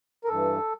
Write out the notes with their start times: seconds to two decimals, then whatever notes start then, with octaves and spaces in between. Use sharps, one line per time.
0.24 A#4
0.28 G2 E3 A4